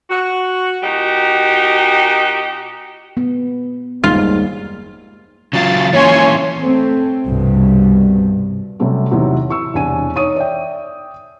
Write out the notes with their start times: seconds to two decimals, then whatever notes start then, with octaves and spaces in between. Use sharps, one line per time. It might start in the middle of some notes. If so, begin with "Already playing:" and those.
0.09 F#4
0.83 A#2 D#4 F#4 G4
3.17 B3
4.04 F#1 D#2 G#2 G3 F4
5.53 C#3 F#3 F4 A6
5.93 E3 A#3 C#4 C#5 G#5 C6
6.62 A3 C4
7.26 C2 G2 B2
8.79 C3 F#3 G3 A3 C#4
9.10 E2 A2 C3 F#3 D#4
9.49 E4 C#6 E6
9.74 E1 C2 D4 G#5 D#7
10.15 D#4 C#5 C#6 D#6 D#7
10.36 D5 E5 G5